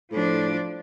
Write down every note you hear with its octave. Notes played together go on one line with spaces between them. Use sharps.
A2 F3 D4